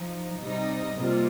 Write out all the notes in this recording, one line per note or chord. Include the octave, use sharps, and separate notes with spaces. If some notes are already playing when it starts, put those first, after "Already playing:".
Already playing: F3 D#4
C3 G3 D#4 D#5
C3 G3 A#3 F4